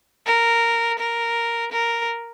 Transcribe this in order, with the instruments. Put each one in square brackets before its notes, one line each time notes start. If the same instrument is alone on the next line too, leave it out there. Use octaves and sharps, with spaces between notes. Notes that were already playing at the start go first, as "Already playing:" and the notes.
[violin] A#4
A#4
A#4